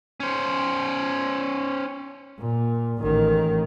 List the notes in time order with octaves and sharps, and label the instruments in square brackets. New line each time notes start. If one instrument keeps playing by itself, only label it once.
[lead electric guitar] C#4 C5
[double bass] A#2
A1 D#3